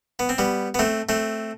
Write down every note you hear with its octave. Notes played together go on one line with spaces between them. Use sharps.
B3
C4
G3 B3
B3
A3 C4
A3 C4